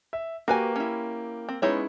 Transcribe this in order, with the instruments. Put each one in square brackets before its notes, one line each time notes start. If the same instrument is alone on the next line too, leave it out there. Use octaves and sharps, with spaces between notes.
[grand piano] E5
[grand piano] A#3 G4 [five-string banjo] F#4 B4 G#5
[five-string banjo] C#4 E4
C4
[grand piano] G#3 B3 C#4 [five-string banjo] D#4 E4 C#5